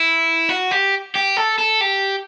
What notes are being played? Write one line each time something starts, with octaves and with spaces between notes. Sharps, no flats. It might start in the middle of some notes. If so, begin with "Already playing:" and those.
Already playing: E4
F#4
G4
G4
A4
A4
G4